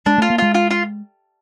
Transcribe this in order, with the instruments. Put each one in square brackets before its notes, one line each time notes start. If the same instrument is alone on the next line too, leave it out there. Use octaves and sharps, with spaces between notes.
[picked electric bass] G#3 [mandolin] D4
[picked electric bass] A3 [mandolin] F4
[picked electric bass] A#3
[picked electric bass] G#3 [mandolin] F4
[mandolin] F4
F4